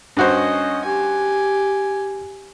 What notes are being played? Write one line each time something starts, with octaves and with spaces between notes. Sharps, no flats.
G2 C#4 F#4 C5 D#5
G4 G#5